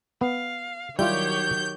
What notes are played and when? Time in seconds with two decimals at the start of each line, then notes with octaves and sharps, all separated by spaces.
0.21 B3 F5
0.99 D#3 F#3 G3 E4 F4 G4 C#5 G6